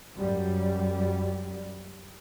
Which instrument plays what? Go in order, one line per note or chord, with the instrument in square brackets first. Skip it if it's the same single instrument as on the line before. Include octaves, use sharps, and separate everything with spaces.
[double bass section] F#2 G3